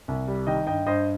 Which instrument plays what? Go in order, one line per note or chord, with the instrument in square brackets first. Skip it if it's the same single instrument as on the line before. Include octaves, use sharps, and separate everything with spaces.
[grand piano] C2
G3
D#3 D#5 G5
G2 D#5 G5
G2 C5 D#5